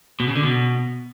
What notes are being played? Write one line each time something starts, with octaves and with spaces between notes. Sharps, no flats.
B2
C#3
D3
B2